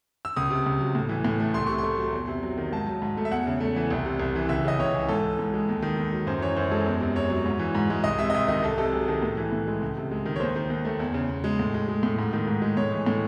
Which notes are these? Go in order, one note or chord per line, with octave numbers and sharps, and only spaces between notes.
E6
C#2 D#6
C3
C#2
F#3
A2
E3
A2
A3
C2 C6
C3 C#6
A3 C6
F#3
E2
C3
F#3
D#3
G#2 A5
F#3
G#2
A3
E5
E2 F#5
C#3
A3
E3
C2
C3
C2
E3
C#2 E5
C#3 D#5
C#2 C#5
E3
G#2 A4
E3
G#2
G#3
D#2
D#3
D#2
F#3
F#2 C5
E3 C#5
F#2 C5
G#3 A4
E2
C3
E2 C#5
F#3
G#2
E3
G#2
G#3
C2 D#5
C3 E5
D#5
C2 E5
D#3 D#5
C2 A4
C3 A4
F#3 G#4
D#3 A4
A2
E3
A2
G#3
C#2
C3
G#3
D#3
C#5
D#2 C5
D#3
D#2
A3
E2
C#3
E2
G#3
A2
G#3
G#3
A2
G#2
D#3
G#2
G#3
A2 C#5
E3
A2